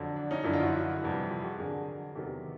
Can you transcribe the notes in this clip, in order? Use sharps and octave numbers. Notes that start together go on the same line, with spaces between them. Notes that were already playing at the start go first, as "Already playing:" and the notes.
Already playing: F2 D3 F#3
D4
C#4 D#4
F#2 D3 F3 D4 E4
D#4 F4
E4 F#4
F2 C3 E3 G3
F4 G4
F#4 G#4
F2 D3 F#3 G#4 A#4
E2 C3 D#3 F#3 G4 A4